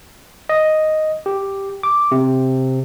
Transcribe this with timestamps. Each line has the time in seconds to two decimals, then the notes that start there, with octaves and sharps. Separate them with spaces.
0.49 D#5
1.26 G4
1.83 D6
2.11 C3